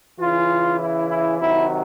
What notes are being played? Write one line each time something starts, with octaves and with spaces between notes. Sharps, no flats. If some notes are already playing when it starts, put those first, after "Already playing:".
C#3 E3 F4
E4
E4
C3 D#3 F#3 E4